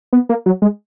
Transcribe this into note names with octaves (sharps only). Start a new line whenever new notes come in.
B3
A#3
F#3
G#3